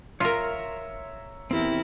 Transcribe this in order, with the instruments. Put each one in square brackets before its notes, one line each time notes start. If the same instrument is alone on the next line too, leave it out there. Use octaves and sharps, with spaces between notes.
[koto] F4 A#4 [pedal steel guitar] C#5 E5 A#5
[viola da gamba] E2 E4 A#4 [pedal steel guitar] C4 G4